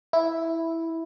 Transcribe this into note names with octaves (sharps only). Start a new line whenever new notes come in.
E4